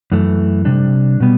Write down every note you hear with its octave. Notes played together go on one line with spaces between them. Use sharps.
F#2 E3 A3
C3 G3 D4
B2 G3 B3